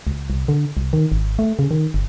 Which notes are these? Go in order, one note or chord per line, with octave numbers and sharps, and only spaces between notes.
C#2
C2
D3
C2
D#3
G#1
A3
C#3
D#3
G1